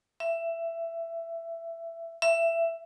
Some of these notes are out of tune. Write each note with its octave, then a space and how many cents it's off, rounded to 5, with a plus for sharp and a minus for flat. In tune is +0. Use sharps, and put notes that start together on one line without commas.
E5 +15
E5 +15